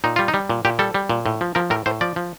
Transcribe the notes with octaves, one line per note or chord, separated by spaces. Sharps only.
A#2 D#4
G3 F4
D#4
G3
A#2
A#2 G4
G3 A4
G3
A#2
A2
F3
F3 A#4
A2 A#4
A2 C5
F3 D5
F3